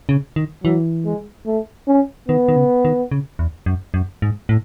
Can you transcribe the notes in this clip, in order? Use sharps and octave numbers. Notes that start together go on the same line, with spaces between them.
C#3
D#3
E3 F#3
G#3
A3
C#4
D#3 B3
D#3
C#3
D#3
C#3
E2
F#2
F#2
G#2
A2